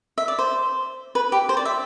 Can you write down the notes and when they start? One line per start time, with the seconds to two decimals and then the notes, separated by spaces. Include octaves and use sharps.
0.18 E5
0.28 D5
0.39 C5
1.15 B4
1.32 G4
1.49 C5
1.57 D5
1.65 E5